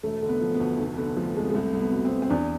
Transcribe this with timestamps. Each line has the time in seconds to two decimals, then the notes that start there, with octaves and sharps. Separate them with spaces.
0.03 E1 A3
0.22 D3
0.29 B3
0.41 F3
0.54 B3
0.60 D2
0.78 F1
0.97 D3 B3
1.17 F3 A3
1.35 F2 G#3
1.49 G#3
1.54 C2 A3
1.73 C2
1.79 B3
1.92 B2
2.05 C4
2.11 B2
2.22 C4
2.29 E2 D4